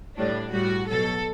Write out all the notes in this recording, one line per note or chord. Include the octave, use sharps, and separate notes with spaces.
A2 G3 D4
A2 G3 F#4
B2 F#3 A4